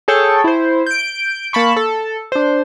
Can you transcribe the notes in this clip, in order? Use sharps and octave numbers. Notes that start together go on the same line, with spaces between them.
G#4 A4 C#5 G5 A5
E4 C5
G6 D7
A#3 A5 B5 C#6
A4
D4 C5